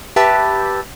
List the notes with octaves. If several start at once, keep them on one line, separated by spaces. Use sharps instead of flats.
G4 B4 E5 A5